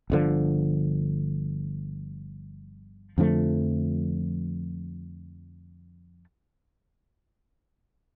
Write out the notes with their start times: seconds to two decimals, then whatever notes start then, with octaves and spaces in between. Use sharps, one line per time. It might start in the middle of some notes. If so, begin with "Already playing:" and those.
0.10 G1 F2 D3 F3
3.18 F2 D3 F3 A3